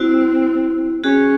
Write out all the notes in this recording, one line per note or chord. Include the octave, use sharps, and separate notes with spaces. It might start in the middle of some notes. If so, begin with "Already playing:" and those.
Already playing: C4 E4 F#4
C#4 F#4 G#4